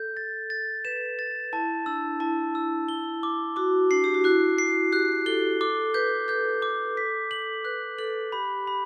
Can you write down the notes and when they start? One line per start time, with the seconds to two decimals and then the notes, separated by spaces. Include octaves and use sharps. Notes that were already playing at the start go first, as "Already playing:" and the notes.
Already playing: A4 G6
0.17 A6
0.50 A6
0.85 B4 E7
1.19 A6
1.53 E4 A5
1.86 D4 E6
2.20 E4 A5
2.55 E6
2.88 G7
3.23 D6
3.56 F#4 D6
3.91 D4 C7
4.04 G4
4.14 F#4
4.24 E4 F#6
4.58 C7
4.92 G4 F#6
5.26 A4 G7
5.61 A4 D6
5.94 B4 G6
6.28 A4 G6
6.62 D6
6.97 B6
7.31 F#7
7.65 B4 F#6
7.98 A4 F#7
8.32 G4 B5
8.67 B5